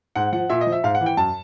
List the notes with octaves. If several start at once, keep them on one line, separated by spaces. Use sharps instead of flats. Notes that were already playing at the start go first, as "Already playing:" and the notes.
G#2 F#5
F3 F#5
A#2 E5
D#5
F3
E5
G#2 F5
F#5
E3
G5
F#2 A5